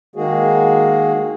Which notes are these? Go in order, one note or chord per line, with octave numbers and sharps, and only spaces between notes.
D#3 G#3 A#3 F#4 G#4